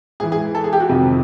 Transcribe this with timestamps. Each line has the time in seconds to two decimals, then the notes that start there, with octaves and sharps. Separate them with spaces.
0.20 G#2 E3 G#4
0.32 G#4
0.55 A4
0.64 G#4
0.73 G4
0.80 F#4
0.89 F2 C3 D#3